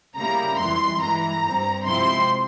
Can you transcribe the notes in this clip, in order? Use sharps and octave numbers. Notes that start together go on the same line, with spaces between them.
C#3 G3 A#3 E4 A#5
F2 E3 G3 C6
G2 E3 G#3 A#5
G2 G3 C4
C3 F3 G#3 C4 E4 C6